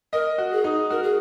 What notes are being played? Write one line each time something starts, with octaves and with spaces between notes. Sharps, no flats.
A#4 D#5
F#4
G#4
D#4
F#4 A#4
G#4